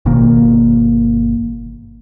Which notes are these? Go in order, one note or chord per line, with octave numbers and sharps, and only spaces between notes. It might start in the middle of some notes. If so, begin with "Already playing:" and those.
G1 B2 D#3 A#3